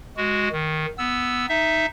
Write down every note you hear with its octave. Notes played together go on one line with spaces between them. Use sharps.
G#3 F#4
D#3
B3 E6
D#4 E5